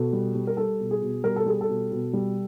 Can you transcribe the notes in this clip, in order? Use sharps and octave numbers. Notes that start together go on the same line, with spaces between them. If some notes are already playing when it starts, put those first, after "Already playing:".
Already playing: B2 A4
G3
G3
A#4
G3 A4
B2
G#4
B2
G3 A#4
A4
G3 G#4
A4
B2
B2
G3